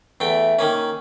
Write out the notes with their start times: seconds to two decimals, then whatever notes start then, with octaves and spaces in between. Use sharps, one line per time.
0.20 E2 A3 G5
0.59 D#3 A#3 C#4